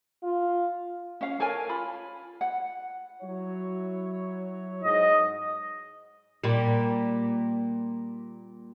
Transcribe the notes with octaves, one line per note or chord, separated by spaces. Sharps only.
F4
C#4 F5
A4 A#4 C#5 G#5
F4 B5
F#5
F#3 E4 C#5
G#2 D#5
A#2 G3